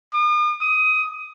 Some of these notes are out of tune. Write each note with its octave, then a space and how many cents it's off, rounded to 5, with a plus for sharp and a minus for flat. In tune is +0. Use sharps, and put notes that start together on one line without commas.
D#6 -45
D#6 +15